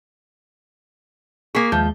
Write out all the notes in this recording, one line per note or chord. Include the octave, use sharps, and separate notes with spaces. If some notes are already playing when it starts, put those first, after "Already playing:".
A#3 G#4 C#6 B6 C7
D#2 F3 G#3 G6